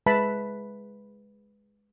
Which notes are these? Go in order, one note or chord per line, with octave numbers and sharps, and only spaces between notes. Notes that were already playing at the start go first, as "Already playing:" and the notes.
G#3 B4 E5 A5 B5